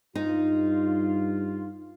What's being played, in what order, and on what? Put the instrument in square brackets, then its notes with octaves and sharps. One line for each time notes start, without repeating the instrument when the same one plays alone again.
[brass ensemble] G2 F4 [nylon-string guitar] D#4